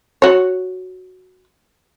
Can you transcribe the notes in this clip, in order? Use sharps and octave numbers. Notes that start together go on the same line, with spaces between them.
F#4 C#5